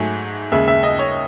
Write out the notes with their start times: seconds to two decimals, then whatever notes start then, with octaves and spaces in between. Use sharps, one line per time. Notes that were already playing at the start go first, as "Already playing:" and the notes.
Already playing: G#2 F#3 A3 G#5
0.52 D#2 C#3 G#3 E5
0.68 E5
0.83 D#5
0.99 C#5